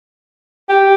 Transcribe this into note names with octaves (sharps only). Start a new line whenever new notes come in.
G4